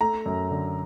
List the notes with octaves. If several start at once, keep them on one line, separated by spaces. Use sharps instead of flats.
A3 A#5
F#2
D3